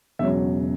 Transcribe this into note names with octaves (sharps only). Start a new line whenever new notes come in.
E1 E2 C#3 F#3 E5